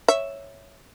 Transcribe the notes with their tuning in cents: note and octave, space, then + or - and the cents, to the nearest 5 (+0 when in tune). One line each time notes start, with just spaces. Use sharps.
C#5 +0 E5 +0